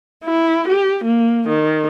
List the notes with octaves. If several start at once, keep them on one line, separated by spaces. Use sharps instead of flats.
E4
G4
A#3
D#3